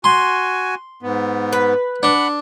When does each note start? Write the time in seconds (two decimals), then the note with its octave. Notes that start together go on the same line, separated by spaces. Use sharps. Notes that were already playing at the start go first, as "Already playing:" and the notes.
0.04 F#4 G#5 C6
1.03 G#2 B3
1.53 B4
2.03 D4 F#5 B5